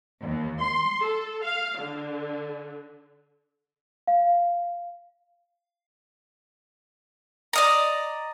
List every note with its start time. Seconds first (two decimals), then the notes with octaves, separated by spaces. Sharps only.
0.21 D#2
0.61 C6
1.01 A4
1.43 F5
1.79 D3
4.07 F5
7.53 D5 D#5 A#5